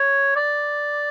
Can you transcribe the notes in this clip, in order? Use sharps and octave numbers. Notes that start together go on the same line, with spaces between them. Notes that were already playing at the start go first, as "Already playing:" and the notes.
Already playing: C#5
D5